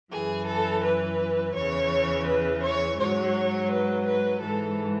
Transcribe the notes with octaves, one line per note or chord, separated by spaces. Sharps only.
F#2 E3 G#4
A4
B4
E2 C#3 E3 C#5
B4
C#5
G#2 F#3 C#5
B4
B4
G#2 E3 A4